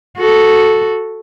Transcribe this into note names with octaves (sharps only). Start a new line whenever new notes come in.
F#4 A4